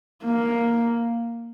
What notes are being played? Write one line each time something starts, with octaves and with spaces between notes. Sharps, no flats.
A#3